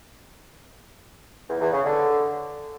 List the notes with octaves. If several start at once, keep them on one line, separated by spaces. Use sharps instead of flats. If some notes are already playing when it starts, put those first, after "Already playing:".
E2
E2
C#3
D3